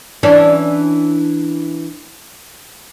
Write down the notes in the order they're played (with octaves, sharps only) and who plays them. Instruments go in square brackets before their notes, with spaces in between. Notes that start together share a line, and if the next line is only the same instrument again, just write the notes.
[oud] E3 C#4 D4